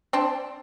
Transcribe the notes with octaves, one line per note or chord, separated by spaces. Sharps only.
C4 D4